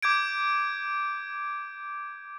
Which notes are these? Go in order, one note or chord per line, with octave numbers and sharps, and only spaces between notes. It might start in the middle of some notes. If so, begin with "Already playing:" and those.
D6 G6 G#6 D7